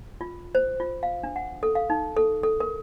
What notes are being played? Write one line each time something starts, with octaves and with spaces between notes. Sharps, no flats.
F4
C5
F4
F5
D4
F#5
A4
F5
D#4
A4
A4
A#4